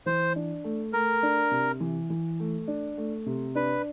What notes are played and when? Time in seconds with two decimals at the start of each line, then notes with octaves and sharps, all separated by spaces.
0.06 E3 C5
0.36 D4
0.64 A3
0.93 A3 A#4
1.23 D4
1.51 C3
1.80 E3
2.10 E3
2.40 A3
2.68 D4
2.97 A3
3.26 C3
3.55 D4 B4